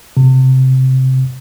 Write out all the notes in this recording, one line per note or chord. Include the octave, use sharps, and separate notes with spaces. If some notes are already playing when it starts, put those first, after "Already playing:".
C3